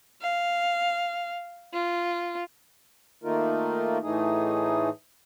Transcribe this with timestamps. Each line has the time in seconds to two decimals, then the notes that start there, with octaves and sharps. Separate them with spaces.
0.22 F5
1.73 F4
3.24 D#3 A3 A#3 D#4 F4 A#4
4.03 A2 E3 A3 D#4 G#4